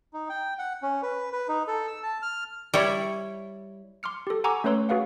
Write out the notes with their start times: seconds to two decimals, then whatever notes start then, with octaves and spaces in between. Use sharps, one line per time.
0.13 D#4
0.29 G5
0.59 F#5
0.82 C#4
1.03 B4
1.33 B4
1.48 D#4
1.68 A4
1.87 E6
2.03 A5
2.22 F6
2.74 G3 E4 C#5
4.03 C6 D6 F6 C#7
4.27 G4 A4
4.44 F#5 G#5 A#5 C#6 D6 E6
4.64 A3 C#4 B4 C#5 C6 E6
4.89 F#4 G#4 B4 F5 F#5